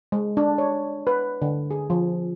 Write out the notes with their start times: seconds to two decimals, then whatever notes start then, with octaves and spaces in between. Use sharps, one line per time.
0.12 G#3
0.37 D4
0.58 C#5
1.07 B4
1.42 D3
1.71 G#4
1.90 F3